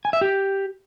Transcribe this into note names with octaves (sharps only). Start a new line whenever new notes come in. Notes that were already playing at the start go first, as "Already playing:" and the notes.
G#5
E5
G4